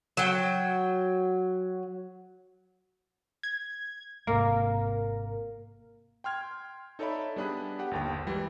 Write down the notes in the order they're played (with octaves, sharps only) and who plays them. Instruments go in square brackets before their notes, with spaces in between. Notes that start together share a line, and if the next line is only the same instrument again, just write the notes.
[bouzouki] F#3 G5
[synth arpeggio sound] G#6
[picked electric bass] G#1 G#2 C3 [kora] A#3 [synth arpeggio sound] A#4
[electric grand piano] G5 C6 F6 G#6
D#4 A4 C#5 D5 E5 B5
G3 B3 D4 G#4 B5 F#6
G4 F#5
G1 D#2 G5
E3 G3 G#3